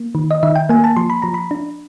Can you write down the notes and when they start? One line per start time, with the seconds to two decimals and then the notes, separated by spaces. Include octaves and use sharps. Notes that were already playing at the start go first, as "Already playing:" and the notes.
Already playing: A#3
0.15 D#3
0.31 D#5
0.43 D#3 E5
0.56 G5
0.69 A#3 G#5
0.84 A5
0.96 F3 C6
1.10 B5
1.22 F3 A#5
1.34 B5
1.51 D4